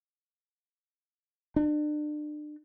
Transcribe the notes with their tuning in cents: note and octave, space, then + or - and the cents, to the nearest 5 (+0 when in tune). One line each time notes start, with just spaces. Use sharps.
D4 +35